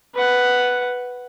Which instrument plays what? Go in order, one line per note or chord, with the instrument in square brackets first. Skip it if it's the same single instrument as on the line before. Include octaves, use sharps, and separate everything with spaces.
[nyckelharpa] B4 F#5